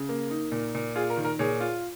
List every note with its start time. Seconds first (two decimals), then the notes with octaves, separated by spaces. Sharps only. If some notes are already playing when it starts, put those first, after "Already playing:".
Already playing: C#3
0.09 A#3
0.30 D#4
0.52 A#2
0.74 A#2
0.96 F4 G#4
1.10 A#4
1.17 D#3
1.25 A#4
1.39 A#2 G#4 C#5
1.60 F4